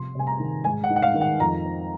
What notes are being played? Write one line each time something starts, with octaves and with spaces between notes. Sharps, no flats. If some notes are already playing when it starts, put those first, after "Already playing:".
Already playing: C3 F3 C6
C3 G#5
A#5
D#3
G#2 G#5
F#5
D#4
F#5
F5
D#3
F#5
F2 A#5
C4